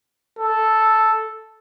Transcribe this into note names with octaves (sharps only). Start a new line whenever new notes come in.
A4